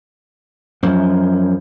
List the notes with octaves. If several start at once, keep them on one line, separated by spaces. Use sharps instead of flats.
F#2 F3